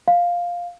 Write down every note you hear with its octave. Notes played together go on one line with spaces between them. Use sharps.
F5